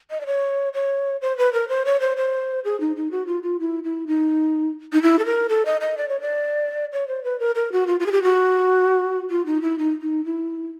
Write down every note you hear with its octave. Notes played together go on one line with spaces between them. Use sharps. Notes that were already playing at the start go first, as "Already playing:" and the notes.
D#5
D5
C#5
C#5
C5
B4
A#4
C5
C#5
C5
C5
G#4
D#4
D#4
F#4
F4
F4
E4
E4
D#4
D#4
E4
A4
A#4
A4
D#5
D#5
D5
C#5
D5
C#5
C5
B4
A#4
A#4
F#4
F4
F4
G#4
G4
F#4
F4
D#4
E4
D#4
D#4
E4